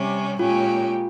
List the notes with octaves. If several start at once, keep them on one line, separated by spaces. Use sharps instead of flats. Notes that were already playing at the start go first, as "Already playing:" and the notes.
Already playing: C3 G3 C#4
A#2 G#3 C#4 F4 G4